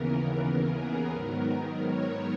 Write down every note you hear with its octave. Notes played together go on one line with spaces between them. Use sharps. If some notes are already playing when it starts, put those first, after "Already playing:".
Already playing: D#2 C#3 E3 B3 A#4
G#4
G#2 D#3 F#3 B3 A#4
C#5